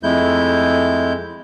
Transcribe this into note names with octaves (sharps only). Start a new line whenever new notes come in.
F2 G#3 A3 E4 G6